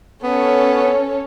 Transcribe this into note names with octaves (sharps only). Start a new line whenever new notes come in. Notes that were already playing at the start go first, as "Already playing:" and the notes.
B3 C#4 A4 C#5